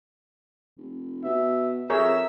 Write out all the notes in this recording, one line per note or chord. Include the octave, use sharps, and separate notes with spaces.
F1
B2 E5
F2 G#4 A#4 C#5 E5 A#5 E6